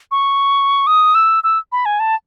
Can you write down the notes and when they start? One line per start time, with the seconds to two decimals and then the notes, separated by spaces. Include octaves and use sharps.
0.11 C#6
0.87 D#6
1.15 E6
1.44 E6
1.72 B5
1.85 G#5
2.00 A5